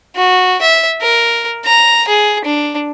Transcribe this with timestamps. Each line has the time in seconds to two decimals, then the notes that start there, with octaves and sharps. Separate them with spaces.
0.16 F#4
0.62 E5
1.01 A#4
1.65 A#5
2.08 G#4
2.44 D4